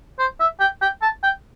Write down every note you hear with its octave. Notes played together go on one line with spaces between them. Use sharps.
C5
E5
G5
G5
A5
G5